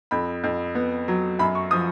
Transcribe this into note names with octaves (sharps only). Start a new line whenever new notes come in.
F2 B5
F2
B3
F#3
F#2 B5
C#6
F3 D#6